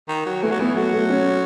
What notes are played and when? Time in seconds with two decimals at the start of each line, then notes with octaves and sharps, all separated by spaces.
0.08 D#3
0.26 F#3
0.42 E3 A3
0.51 F#3
0.59 E3 B3
0.77 F#3 A3
0.93 A3
1.10 C#4